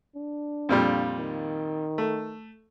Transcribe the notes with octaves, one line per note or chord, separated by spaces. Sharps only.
D4
F2 A#2 G3
D#3
A3